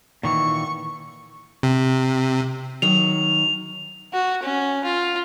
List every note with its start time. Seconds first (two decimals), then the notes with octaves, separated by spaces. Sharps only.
0.23 A#2 D#3 E3 C#6
1.63 C3
2.82 D#3 F#3 F7
4.13 F#4
4.43 C#4
4.84 F4